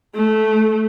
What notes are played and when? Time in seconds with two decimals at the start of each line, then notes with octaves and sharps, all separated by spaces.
0.15 A3